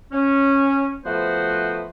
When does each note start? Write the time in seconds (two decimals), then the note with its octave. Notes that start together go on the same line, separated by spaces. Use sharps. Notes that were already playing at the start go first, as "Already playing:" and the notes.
0.11 C#4
1.05 F3 A3 B3 F#4 B4 C5